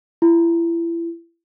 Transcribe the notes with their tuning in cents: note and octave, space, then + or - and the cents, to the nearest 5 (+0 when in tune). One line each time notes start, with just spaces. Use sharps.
E4 +30